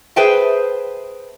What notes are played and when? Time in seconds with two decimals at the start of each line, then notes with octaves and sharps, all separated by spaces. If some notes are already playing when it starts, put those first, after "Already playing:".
0.16 G#4 B4 C5 E5 G5 A5